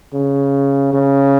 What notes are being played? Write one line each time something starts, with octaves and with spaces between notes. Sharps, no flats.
C#3
C#3